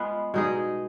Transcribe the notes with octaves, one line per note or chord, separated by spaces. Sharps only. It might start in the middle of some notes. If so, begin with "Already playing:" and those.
Already playing: G#3 B3 F4 B4
B2 G#3 D#4 G#4